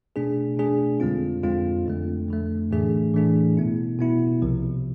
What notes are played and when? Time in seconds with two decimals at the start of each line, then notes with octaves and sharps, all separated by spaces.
0.16 B2 A3 D4 G#4
0.57 B2 A3 D4 G#4
1.00 F2 D3 G#3 C4 F4
1.43 F2 D3 G#3 C4 F4
1.86 F2 D3 A3
2.28 F2 D3 A3
2.71 A2 E3 A3 D4 G#4
3.14 A2 E3 A3 D4 G#4
3.57 B2 B3 E4
3.99 B2 B3 E4
4.42 C2 C3 F3